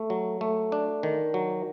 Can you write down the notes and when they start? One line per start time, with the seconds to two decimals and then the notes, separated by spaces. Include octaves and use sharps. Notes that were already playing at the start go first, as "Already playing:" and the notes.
Already playing: A3
0.10 F#3
0.41 A3
0.72 D4
1.03 D#3
1.34 F#3